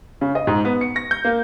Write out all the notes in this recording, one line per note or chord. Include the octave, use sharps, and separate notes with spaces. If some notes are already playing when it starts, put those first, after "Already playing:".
C#3
D#5
G#2
B3
C#7
A#6
G6
A#3